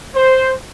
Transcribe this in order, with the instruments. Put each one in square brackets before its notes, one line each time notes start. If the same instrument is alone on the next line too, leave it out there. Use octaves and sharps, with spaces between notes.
[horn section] C5